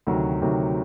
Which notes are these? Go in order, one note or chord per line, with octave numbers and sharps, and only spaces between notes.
D2 C3 D#3 F#3
D2 C3 D#3 F#3